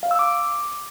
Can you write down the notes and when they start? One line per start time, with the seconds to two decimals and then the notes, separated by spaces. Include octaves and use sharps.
0.03 F5
0.11 E6
0.19 D6